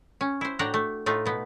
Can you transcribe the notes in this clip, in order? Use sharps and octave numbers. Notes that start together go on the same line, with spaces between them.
C#4
E4 C5
A2 D4 F#4 F#5 G5 A#5
A3
A2 A3 D#4 F4
B2 B3